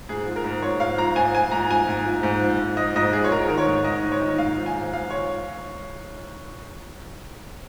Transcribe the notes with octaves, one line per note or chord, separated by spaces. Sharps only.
G#2 G#4
F3
A#4
G#2
F3 C#5
G#2 F5
F3 A#5
G#2 G#5
F3 G#5
G#2 A#5
F3 G#5
G#2
F3
G#2
F3
G#2
F3 D#5
G#2 D#5
F3 G#4
C#5
G#2 A#4
D#3 A#4
C#5
G#2
D#3 D#5
G#2
C#5
D#3
G#2 F5
F3
G#5
G#2
F3 F5
C#5